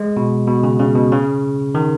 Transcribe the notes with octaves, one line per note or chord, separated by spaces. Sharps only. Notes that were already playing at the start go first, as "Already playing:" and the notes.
Already playing: G#3
B2
B2
C#3
C#3
B2
C#3
D#3